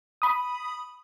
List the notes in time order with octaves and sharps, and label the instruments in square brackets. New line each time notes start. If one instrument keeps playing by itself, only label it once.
[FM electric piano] B5 D#6